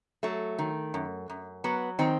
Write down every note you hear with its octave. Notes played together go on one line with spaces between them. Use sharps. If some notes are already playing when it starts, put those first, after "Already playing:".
F#3 A3
D#3
F#2
F#2
F#3 B3
D#3 C4